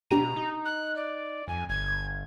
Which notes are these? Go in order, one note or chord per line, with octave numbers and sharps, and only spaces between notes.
B2 D4 G4 A#5 D#7
D#4
F#6
D5
F2 G#5
G1 G#6